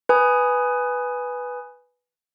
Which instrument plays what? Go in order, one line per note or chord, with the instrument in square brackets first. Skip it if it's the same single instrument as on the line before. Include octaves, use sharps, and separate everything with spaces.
[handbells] B4 G#5 D#6